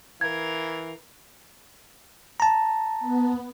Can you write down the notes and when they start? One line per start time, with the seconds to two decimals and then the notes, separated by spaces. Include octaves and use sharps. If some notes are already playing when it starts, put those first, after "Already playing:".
0.21 E3 A#4 F5 G#6
2.40 A5 A#5
3.00 B3